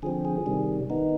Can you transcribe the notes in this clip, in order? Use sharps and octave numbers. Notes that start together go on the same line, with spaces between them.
D3 F3 C4 G#4
G#4
C3 D#3 G3
D#3 B3 D#4